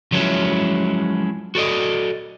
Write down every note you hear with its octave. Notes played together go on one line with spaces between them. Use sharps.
F3 F#3 G#3 C#4 E4
F#4 A4 D5 D#5